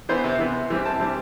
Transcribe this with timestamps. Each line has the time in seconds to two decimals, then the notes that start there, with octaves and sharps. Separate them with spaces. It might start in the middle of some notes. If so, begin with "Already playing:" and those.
0.09 E3 B3 C5
0.24 C3
0.39 E3 B3
0.54 C3
0.70 E3 G3 C4
0.86 C3 A5
1.00 E3 G3 C4